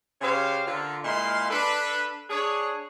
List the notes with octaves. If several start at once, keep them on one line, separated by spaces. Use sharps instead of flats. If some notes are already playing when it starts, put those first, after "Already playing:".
C#3 G4 C5 C#5 F5
D3 F4 A#4
A#2 G#3 E4 D#5 F5 C6
D4 A4 B4
D4 G#4 C#5